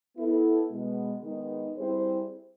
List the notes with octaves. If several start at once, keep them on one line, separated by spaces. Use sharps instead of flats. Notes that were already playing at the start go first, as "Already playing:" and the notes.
B3 E4 A4
B2 G#3 B3
D#3 G#3 B3 D#4
G3 C4 E4 G#4 C5